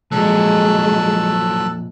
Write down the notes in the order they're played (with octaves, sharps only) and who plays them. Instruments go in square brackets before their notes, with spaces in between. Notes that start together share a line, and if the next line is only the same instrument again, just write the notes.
[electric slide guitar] F2 A#2 [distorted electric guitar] F3 F#3 [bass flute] G#3 [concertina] A4 E6 F#6